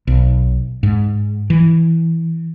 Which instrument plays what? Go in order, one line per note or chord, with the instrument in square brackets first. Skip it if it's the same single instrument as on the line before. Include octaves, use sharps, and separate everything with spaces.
[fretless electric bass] B1
G#2
E3